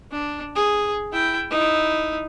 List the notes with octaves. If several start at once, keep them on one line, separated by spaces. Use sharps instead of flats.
D4
G#4
E4 G5
D#4 E4